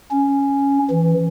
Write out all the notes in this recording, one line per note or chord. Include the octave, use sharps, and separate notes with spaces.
C#4
E3